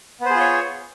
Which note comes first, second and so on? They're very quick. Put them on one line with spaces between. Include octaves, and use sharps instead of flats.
B3 C5 G#4 F4 C#5